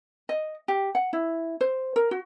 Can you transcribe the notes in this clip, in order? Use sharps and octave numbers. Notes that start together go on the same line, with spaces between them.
D#5
G4
F#5
E4
C5
A#4
F#4